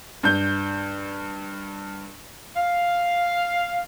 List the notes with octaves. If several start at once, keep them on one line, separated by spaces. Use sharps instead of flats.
G2 G6
F5